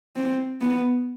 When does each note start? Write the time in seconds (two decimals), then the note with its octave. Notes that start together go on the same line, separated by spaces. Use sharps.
0.16 C4
0.61 B3